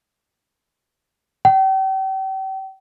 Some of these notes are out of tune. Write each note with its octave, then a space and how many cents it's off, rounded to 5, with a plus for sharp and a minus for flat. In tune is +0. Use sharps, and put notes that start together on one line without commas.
G5 -40